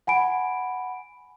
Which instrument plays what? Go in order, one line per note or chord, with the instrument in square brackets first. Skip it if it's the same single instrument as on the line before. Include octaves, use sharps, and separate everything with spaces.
[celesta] F#5 G#5 B5 D7